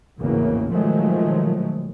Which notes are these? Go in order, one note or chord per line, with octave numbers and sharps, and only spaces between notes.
G#1 E2 A2 C#3 A#3
B2 D#3 F3 F#3 G#3 A3